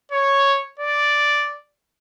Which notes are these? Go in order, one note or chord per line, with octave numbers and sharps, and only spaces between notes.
C#5
D5